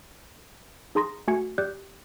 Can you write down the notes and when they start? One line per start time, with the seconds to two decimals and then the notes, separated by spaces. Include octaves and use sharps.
0.95 D#4 G#4 A#5 C6 D#6 A#6
1.28 A3 F#4 G#5 G#6 C#7
1.58 G4 D5 F#6 G6